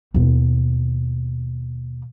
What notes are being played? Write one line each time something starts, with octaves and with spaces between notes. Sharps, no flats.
D#2 B2